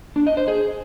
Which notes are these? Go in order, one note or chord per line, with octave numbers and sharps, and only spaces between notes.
D4
D#5
C5
G#4